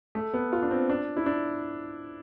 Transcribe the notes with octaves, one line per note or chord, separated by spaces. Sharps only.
A3
B3
F4
D4
C4
D4
E4
D4